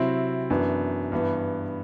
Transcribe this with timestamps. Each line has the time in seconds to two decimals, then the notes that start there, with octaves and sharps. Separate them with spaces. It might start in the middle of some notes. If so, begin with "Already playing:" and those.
Already playing: C3 F#3 C4 E4
0.50 F#2 E3 B3 D4
1.12 G2 E3 B3